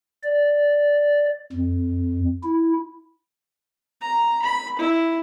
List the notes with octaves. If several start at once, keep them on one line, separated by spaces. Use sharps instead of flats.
D5
F2
E4
A#5
B5
E4